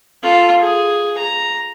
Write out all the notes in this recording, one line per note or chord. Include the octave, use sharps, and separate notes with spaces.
F4 A4
G#4
A#5